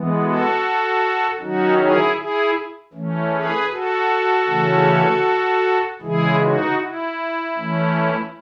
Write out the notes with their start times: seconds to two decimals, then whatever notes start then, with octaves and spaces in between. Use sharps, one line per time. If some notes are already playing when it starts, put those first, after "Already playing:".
Already playing: E3 G#3 B3
0.23 F#4 A4
1.39 D#3 F#3 C#4 D#4 F#4
1.78 E4 G#4
2.16 E4 G#4
2.93 E3 A3 C#4
3.32 G#4 B4
3.70 F#4 A4
4.48 C#3 E3 A3 C#4
6.02 C#3 E3 G#3 E4 G#4
6.40 D#4 F#4
6.78 E4
7.56 E3 A3 C#4